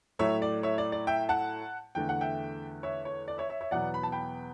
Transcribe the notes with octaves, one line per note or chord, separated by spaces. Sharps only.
A2 F#3 A3 C#5 E5
D5
C#5 E5
D5
D5
E5 G5
F#5 A5
E2 D3 A3 G5
F#5
E5 G5
C#5 E5
C#5
D5
C#5 E5
C#5 E5
C#5 E5
E2 B2 F#3 B3 D5 F#5
B5
A5
G5 B5